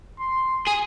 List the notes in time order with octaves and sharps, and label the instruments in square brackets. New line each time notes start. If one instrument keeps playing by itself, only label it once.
[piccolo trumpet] C6
[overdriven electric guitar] G#4